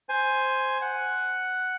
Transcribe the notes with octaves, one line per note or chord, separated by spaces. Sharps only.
C5 G#5
F#5